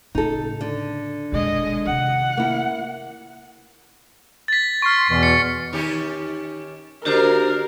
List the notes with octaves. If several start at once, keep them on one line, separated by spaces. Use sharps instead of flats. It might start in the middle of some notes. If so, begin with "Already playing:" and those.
A2 C#3 D#4 A4
D3
E1 A#2 G#3 D#5
C3 D#3 F#5
A#3 E4
A6 B6
C6 C#6 F6
E2 B2 E3
C#7
D#3 C#4 G4
D3 A#3 D4 F#4 G4 A#4 C5